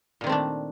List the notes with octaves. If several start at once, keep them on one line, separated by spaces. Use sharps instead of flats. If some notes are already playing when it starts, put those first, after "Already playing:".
A#2 D#3 A3 C4 D4